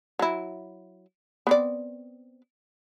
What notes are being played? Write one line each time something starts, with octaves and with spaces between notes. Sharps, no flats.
F#3 E4
B3 C4 D5